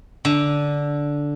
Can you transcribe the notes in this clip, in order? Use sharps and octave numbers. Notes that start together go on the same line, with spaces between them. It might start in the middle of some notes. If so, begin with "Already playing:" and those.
D3